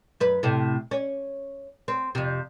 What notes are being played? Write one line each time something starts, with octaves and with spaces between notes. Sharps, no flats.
F#2 B4
A2 C3
C#4
C4
F2 C3